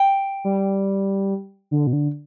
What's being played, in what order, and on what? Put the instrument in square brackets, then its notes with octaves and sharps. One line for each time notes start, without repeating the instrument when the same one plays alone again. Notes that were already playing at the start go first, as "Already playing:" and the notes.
Already playing: [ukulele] G5
[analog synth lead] G3
D3
B2
D3